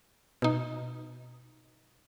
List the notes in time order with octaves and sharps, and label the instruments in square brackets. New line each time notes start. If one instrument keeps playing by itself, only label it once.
[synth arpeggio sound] B2 D#4